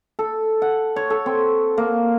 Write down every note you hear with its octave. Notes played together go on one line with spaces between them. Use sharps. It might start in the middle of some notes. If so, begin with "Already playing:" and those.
A4
F#5
C#5
A4
C4
A#3